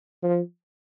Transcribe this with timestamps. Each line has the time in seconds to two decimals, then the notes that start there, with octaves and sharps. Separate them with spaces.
0.22 F3